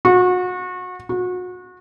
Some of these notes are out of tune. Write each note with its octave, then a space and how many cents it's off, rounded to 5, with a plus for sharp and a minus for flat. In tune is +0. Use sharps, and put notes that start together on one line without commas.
F#4 -30
F#4 -30